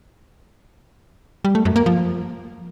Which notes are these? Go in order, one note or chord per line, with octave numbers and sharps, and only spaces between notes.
G3
A3
F#2
A#3
F3